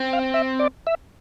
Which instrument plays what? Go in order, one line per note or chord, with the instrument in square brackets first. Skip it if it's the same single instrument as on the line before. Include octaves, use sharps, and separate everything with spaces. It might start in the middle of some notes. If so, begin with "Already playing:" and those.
Already playing: [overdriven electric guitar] C4
[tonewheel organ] F5
E5
D5
E5